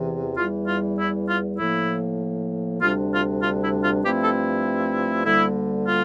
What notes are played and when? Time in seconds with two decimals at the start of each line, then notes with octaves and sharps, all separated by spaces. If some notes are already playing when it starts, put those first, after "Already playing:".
Already playing: E2 C3 E3
0.36 E2 E3 G3 F4
0.67 F4
0.98 E4
1.28 F4
1.58 A2 F3 A#3 E4
2.81 D2 C3 G3 D4 F4
3.12 F4
3.42 F4
3.63 E4
3.83 F4
4.03 G2 F3 A3 C4 E4 G4
4.23 A4
5.25 D2 D3 G3 A#3 E4
5.86 F4